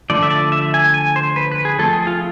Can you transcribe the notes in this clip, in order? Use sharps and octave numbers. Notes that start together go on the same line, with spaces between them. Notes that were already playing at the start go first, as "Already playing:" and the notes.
D3 F3 A3 D5
E5
D5
E5
G#5
G#5
C5
B4
B4
G#4
F3 A3 C4 A4
G#4
F4